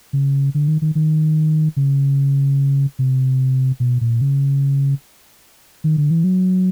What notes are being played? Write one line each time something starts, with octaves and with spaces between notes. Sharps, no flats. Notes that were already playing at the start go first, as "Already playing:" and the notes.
C#3
D3
D#3
D#3
D#3
C#3
C3
B2
A#2
C#3
D#3
D3
E3
F#3